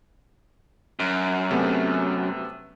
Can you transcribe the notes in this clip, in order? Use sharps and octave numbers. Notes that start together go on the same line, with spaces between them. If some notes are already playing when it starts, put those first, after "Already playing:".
F#2
C3 A3 B3